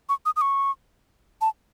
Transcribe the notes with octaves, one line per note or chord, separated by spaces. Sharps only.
C#6
D#6
D#6
C#6
A5